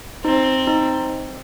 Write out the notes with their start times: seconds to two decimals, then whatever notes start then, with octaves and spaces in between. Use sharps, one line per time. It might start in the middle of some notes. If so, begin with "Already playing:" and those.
0.24 C4 D#4
0.67 D#4